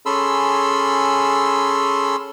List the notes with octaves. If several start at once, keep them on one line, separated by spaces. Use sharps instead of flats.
C#4 G#4 A4 B5 C6 E6